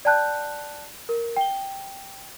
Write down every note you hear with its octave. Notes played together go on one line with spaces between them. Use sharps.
D5 G5 A5 F#6 G6
A#4
G5 G7